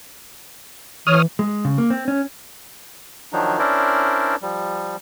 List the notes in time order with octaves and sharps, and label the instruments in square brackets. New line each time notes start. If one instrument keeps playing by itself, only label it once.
[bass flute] E3 [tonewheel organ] C#5 D#6 F6
[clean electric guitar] G#3
C#3
A#3
C4
C#4
[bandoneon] D#3 F3 F#3 D4 D#4
C#4 D4 E4 A#4 C5 D5
F3 G3